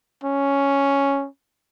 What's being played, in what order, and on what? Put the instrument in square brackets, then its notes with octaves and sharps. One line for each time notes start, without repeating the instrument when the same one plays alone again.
[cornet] C#4